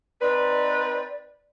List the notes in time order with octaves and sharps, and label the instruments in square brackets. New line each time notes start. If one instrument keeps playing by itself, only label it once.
[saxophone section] C4 D#4 B4 [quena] D5